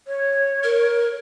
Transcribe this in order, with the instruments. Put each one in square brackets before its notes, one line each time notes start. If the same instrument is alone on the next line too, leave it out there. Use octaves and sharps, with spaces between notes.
[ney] C#5
[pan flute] A#4